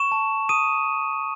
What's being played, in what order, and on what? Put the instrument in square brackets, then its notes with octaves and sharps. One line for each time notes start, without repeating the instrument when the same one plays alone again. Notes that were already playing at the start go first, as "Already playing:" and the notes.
Already playing: [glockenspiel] C#6 E7
A5
D#6 D#7